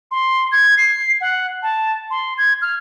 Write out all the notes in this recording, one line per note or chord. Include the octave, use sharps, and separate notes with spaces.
C6
G#6
C7
F#5
A5
C6
G#6
F6